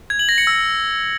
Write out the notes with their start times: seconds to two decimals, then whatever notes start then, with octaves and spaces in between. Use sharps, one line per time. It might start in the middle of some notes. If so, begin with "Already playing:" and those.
0.10 G#6
0.19 F#7
0.29 A#6
0.38 C#7
0.47 E6